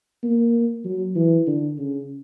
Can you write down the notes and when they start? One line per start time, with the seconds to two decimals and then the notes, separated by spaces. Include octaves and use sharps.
0.23 A#3
0.85 F#3
1.16 E3
1.47 D3
1.78 C#3